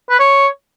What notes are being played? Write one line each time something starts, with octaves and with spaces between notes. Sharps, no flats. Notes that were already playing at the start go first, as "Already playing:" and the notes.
B4
C#5